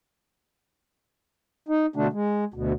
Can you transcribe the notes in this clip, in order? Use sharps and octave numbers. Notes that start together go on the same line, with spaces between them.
D#4
B2 D3 A3 D4
G#3
D2 B2